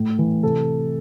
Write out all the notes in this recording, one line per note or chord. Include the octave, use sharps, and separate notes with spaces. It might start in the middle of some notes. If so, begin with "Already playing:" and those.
Already playing: A2
E3
C3 A4